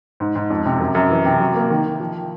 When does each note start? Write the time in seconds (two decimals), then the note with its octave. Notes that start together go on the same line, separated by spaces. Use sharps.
0.20 G#2
0.36 G#2
0.50 F2
0.66 C3
0.80 F#2
0.95 F#2
1.10 E3
1.25 C3
1.40 F#3
1.55 A#3
1.70 D#3
1.85 D#3
2.00 F3